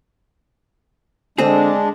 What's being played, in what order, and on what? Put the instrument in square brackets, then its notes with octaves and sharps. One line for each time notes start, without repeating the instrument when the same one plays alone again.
[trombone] D3 [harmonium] G#3 D4 [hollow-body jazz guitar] C4 G#4